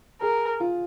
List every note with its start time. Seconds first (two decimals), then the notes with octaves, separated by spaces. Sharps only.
0.22 G#4 A#4
0.60 F4